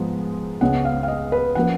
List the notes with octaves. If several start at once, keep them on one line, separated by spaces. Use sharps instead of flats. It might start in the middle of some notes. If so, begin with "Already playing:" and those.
Already playing: G#2 F3 G#3 B3
C#2 C#3 G#3 B3 F#5
F5
F5
D#5
B4
F3 A#3 C#4 F#5